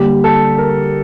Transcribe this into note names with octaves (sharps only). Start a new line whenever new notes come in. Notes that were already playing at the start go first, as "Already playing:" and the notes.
Already playing: D3 G3 A#3 G4
A4
A#4